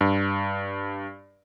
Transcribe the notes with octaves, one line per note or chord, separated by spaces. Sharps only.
G2